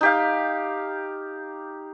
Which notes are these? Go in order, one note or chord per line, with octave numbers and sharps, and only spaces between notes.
D#4 G4 F5